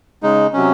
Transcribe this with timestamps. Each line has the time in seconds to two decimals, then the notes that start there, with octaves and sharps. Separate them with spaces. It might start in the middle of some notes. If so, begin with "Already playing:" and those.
0.23 C#3 G#3 D#4
0.53 C3 F#3 C#4